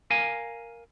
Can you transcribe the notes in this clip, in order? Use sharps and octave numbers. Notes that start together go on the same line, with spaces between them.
A#4 F5 G#5